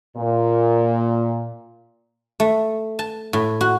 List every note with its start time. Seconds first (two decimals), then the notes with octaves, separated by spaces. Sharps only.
0.17 A#2
2.40 A3
2.99 A5
3.33 A2
3.61 F#4